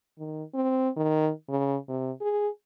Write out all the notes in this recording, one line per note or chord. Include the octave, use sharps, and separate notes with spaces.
D#3
C4
D#3
C#3
C3
G#4